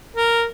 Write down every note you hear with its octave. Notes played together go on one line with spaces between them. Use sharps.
A#4